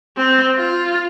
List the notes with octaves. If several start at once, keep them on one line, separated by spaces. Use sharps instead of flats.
C4
F4